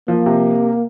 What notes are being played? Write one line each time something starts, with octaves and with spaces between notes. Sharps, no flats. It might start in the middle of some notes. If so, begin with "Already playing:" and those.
F3 A#3
C3